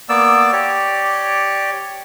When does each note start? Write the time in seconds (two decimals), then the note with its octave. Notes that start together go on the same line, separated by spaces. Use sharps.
0.09 A#3 B3 D5 E6
0.52 G4 C#5 D5